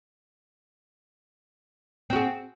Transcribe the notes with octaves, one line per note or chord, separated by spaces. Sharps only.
C4 F#4 G#4